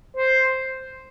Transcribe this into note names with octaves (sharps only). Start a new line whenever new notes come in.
C5